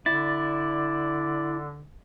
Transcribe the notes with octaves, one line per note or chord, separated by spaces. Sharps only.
D3 E4 D5 A6